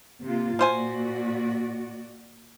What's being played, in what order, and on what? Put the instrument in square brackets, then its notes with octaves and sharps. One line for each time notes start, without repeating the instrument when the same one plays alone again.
[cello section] C3 A#3 F4
[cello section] A#2 F#4 D5 [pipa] F3 C5 G#5